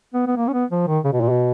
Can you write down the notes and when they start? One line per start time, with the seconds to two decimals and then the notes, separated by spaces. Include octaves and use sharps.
0.14 B3
0.27 B3
0.37 A#3
0.48 C#4
0.53 B3
0.71 F3
0.87 D#3
1.04 C#3
1.13 B2
1.21 A#2
1.29 B2